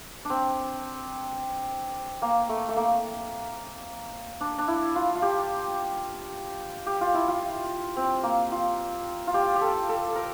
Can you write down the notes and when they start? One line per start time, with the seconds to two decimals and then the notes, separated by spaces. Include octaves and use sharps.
0.25 C4 D4
2.22 A#3
2.49 A3
2.69 A3
2.77 A#3
4.41 D4
4.58 D4
4.68 E4
4.95 F4
5.15 F4
5.22 G4
6.86 G4
7.01 F4
7.14 E4
7.28 F4
7.96 C4
8.23 A#3
8.52 F4
9.27 F4
9.34 G4
9.56 G4
9.61 A4
9.89 A4
10.15 A#4